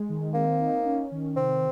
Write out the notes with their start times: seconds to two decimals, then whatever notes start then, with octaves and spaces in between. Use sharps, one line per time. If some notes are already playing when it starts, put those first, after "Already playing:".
Already playing: G#3
0.09 D#3
0.34 A#3 C4
0.60 D#4
0.85 C#4
1.11 D#3
1.36 C3 C4